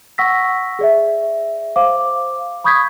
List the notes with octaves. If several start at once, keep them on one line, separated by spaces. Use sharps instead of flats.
F#5 C#6 E6 A#6 B6
G#4 D5 E5
C5 F5 D6
B5 C#6 D#6 G6 G#6 B6